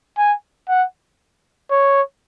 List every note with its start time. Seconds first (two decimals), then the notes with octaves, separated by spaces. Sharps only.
0.18 G#5
0.68 F#5
1.71 C#5